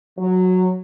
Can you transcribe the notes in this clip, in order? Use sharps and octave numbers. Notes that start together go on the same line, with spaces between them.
F#3